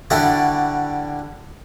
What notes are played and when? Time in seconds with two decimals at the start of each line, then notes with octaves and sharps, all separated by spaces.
0.10 D3 G3 E4 F#4 D5